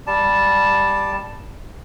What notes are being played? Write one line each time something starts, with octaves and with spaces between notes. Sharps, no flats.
G3 A5